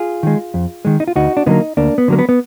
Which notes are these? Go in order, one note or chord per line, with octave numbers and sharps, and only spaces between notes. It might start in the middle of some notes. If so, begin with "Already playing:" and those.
Already playing: F4 G#4
D#3 G#3
F2
D#3 G#3
D#4
F4
D2 D#4 F#4
D4
D3 F#3 A#3 B3 D#4
D2 A#3 D4
B3
D3 F#3 A#3
B3
B3